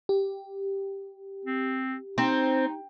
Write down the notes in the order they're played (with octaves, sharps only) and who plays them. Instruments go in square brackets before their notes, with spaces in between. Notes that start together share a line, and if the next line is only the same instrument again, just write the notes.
[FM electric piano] G4
[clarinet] C4
[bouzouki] C4 [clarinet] D#4